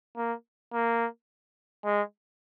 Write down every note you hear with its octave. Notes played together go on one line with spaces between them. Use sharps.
A#3
A#3
G#3